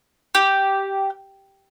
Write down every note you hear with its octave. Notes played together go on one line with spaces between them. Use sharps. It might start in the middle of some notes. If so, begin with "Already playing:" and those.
G4